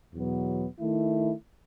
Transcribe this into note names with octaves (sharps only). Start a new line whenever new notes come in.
E2 B2 F#3 B3
D#3 A3 E4